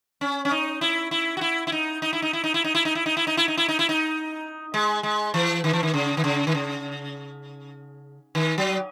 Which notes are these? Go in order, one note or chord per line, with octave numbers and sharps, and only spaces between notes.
C#4
C#4
D#4
E4
E4
F#4
E4
E4
D#4
D#4
E4
D#4
E4
D#4
E4
D#4
E4
D#4
E4
D#4
E4
D#4
E4
D#4
E4
D#4
E4
D#4
G#3
G#3
E3
D#3
E3
D#3
C#3
D#3
C#3
D#3
C#3
D#3
F#3